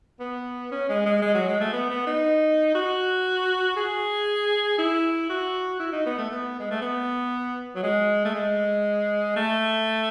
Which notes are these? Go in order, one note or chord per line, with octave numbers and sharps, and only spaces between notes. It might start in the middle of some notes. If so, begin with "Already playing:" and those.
B3
C#4
G#3
G#3
G#3
F#3
G#3
A3
B3
B3
D#4
F#4
G#4
E4
F#4
E4
D#4
B3
A3
B3
G#3
A3
B3
F#3
G#3
A3
G#3
A3